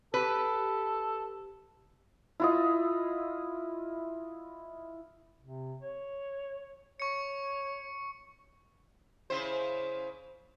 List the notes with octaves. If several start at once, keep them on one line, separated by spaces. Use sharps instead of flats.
G4 A4 B4
E4 F4 D#5
C3
C#5
C#5 C#6 C#7
C#3 E4 C5